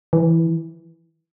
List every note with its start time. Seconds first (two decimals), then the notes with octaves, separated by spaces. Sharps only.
0.13 E3